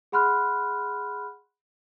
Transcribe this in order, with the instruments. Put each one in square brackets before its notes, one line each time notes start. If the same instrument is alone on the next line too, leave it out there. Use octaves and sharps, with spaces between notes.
[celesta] G#4 F#5 B5 C6 F6 F#6